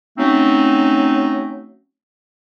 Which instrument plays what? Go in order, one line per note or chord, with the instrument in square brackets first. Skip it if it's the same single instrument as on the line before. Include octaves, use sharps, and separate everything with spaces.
[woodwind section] F#3 A3 C4 C#4 D#4